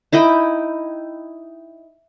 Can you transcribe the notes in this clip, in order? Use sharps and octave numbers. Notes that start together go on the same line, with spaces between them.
D#4 E4 D#5 G5